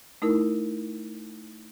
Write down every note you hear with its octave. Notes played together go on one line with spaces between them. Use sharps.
A3 D#4 E4 A#4